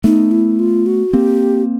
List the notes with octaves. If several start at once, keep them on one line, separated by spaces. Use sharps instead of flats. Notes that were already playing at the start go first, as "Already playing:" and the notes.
A3 B3 D#4
E4
F4
F#4
A#3 C4 G4